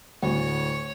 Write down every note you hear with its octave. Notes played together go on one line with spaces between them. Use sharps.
D2 A2 C#5